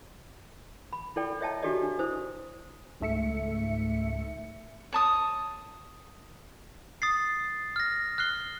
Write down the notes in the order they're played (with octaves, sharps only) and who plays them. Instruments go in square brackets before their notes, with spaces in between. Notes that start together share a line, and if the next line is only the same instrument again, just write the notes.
[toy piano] B5
E4 A4 D5 G5
C#5 D#5 E5 G5 A5 A#5
D4 F#4 G4 A4 D5 D#5
D4
E4 C5 D#6
[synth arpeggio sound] C#2 G#2 A3 E5 C#7
[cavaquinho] C#5 A5 D#6
[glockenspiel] D#6 A6 C7
F6 A#6
F6 F#6 C7 G7